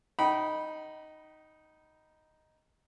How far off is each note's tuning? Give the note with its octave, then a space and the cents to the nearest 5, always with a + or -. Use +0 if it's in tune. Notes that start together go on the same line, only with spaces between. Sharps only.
D#4 +0 G5 -45 B5 -15